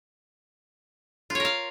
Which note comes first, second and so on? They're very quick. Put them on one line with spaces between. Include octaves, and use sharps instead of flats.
F4 C#5 A#4 F5